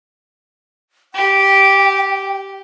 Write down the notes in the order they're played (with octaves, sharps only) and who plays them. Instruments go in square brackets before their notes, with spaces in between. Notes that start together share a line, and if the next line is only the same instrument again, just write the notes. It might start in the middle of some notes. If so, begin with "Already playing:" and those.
[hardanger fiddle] G4 [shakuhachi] G5